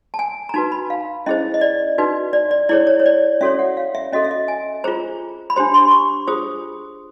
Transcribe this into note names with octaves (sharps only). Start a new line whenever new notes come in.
A5
G#5
A#5
D#4 F#4 B4 A5
B5
F5
C#4 E4 G#4 C5 D#5
D#5
D5
D#4 F#4 B4
D5
D5
E4 G#4 C#5 D5
C#5
C#5
D5
C#4 F#4 A4 C#5 E5
F#5
F5
E5
C#4 F#4 A4 D#5
E5
D#5
G#5
F4 G#4 C5 A#5
B5
D4 G4 C5 C6
C6
C6
C#6
F4 G#4 C5 D#6